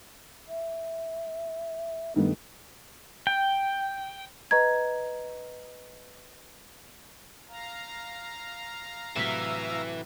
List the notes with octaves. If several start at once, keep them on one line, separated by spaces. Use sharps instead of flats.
E5
G2 D#3 A3 B3
G5
B4 D#5 A#5 G#6
F5 A#5
A2 C3 E3 F#3 E5